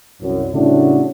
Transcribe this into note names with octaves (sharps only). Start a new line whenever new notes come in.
C2 F#2
A2 C#3 F#3 G3 A3 D4